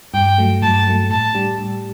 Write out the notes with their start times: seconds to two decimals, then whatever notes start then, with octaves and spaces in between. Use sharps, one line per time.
0.14 G2 G5
0.38 F#3 A3
0.62 G2 A5
0.87 F#3 A3
1.10 A2 A5
1.34 G3 D4 G4
1.58 A2